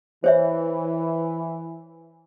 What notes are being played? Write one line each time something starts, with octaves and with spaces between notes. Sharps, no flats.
E3 C5 C#5 E5